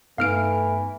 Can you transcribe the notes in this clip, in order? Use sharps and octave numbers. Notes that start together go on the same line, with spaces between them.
G2 E3 A3 B3 D#4 F5 F6 D7